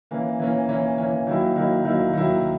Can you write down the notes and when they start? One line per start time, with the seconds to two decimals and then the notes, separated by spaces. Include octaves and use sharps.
0.11 E3 A#3 C#4
0.40 E3 A#3 C#4
0.69 E3 A#3 C#4
0.98 E3 A#3 C#4
1.27 D#3 F#3 A#3 E4
1.56 D#3 F#3 A#3 E4
1.85 D#3 F#3 A#3 E4
2.13 D#3 F#3 A#3 E4